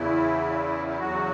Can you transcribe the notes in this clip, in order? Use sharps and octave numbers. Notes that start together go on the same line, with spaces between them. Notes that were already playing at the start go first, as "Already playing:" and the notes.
Already playing: E2 C#3 E3 E4
E4
E2 C#3 F#3 F#4